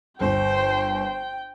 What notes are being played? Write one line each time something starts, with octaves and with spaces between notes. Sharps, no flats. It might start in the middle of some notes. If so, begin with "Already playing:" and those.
G1 C5 G5